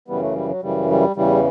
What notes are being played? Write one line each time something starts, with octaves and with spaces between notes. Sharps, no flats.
F#2 C#3 E3 G3 B3
F#3 A3
G3
F#3
F#2 C#3 E3 G3
G3
E2 C#3 E3 G3